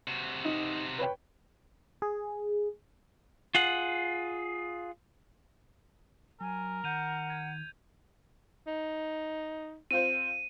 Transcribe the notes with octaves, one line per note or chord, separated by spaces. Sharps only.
C3 F#4
D#4
B4 C#5 G5
G#4
F4 G#4 F#5
F#3 A#4 G#5
D#3 F#5 G6 D#7 F7
G#6
D#4
C4 F4 C5 D#7